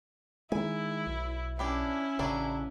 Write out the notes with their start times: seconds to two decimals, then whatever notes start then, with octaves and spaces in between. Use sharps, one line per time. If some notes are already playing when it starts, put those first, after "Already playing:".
0.52 D#3 G#3 E4 G#5
1.06 B1
1.59 C#4 D4 E4 G4 B4
2.19 A1 C#3 E3 F#3 D4